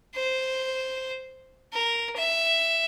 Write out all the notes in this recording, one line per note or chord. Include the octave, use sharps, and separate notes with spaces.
C5
A#4
E5